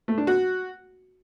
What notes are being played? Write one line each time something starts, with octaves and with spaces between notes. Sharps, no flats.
A3
D4
F#4